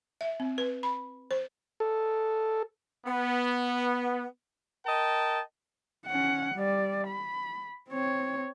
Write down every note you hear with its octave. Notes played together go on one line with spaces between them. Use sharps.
E5
C4
B4
B5
C5
A4
B3
A#4 D#5 G5 A5
C#4 F#5
G3 D5
B5
C4 C#5